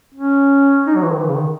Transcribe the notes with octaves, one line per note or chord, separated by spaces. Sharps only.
C#4
D#4
F#3
E3
D#3
E3
C#3
D#3